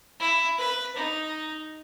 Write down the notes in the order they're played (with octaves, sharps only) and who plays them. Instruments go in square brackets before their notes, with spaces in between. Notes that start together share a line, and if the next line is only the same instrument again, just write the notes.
[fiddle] E4
B4
D#4